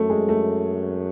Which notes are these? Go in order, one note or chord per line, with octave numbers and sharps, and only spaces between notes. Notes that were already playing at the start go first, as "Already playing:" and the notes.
Already playing: F#2 A3
G#3
A3